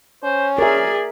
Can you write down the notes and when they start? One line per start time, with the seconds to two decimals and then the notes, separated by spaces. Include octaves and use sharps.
0.23 C#4 C5
0.58 G#4 A#4 D5 E5